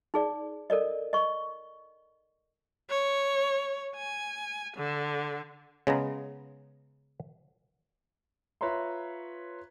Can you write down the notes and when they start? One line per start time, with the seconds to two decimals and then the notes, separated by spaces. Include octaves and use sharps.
0.14 D#4 G#4 D5
0.70 A4 A#4 D5 D#5
1.13 D#5 C#6
2.90 C#5
3.95 G#5
4.76 D3
5.87 C#3 G#3 B3 A#5
8.61 F4 B4 C#5 E5 A#5 C6